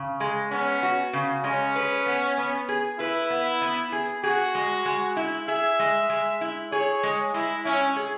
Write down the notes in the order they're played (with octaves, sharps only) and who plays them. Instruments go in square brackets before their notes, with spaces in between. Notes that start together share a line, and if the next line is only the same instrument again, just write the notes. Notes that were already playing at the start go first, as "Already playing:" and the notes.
Already playing: [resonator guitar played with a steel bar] C#3
G#3
[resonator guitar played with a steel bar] B3 [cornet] C#4
[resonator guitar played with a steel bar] F#4
C#3
[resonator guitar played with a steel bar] G#3 [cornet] C#4
[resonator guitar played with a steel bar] B4
B3
B3
G#4
[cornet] E4 [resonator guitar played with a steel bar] B4
[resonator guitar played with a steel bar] B3
B3
G#4
[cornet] F#4 [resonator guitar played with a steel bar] G#4
[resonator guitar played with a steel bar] G#3
G#3
E4
[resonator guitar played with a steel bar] G#4 [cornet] E5
[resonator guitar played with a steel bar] G#3
G#3
E4
[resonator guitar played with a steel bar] G#4 [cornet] C#5
[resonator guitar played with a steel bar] G#3
[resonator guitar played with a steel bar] G#3 [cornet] E4
[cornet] C#4 [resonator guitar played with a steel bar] E4
[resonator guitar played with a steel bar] G#4